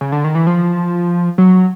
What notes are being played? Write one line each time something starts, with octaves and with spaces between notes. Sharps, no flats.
C#3
D3
D#3
E3
F3
F#3